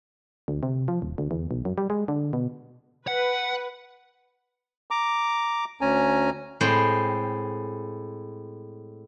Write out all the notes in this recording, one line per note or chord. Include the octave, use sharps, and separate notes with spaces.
D2
C3
F3
D#1
D2
E2
B1
F#2
G3
G#3
D3
B2
B4 F#5
A#5 D6
D2 C#4 G#5 A#5
A2 G#3 C4 G5